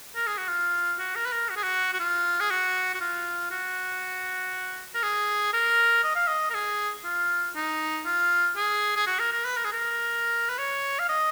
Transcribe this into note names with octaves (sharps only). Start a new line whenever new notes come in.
A#4
G#4
F#4
F4
F#4
A#4
B4
A#4
F#4
G#4
F#4
F#4
F4
G#4
F#4
F#4
F4
F#4
A#4
G#4
A#4
D#5
F5
D#5
A#4
G#4
F4
D#4
F4
G#4
G#4
F#4
A#4
A#4
B4
A#4
G#4
A#4
B4
C#5
F5
D#5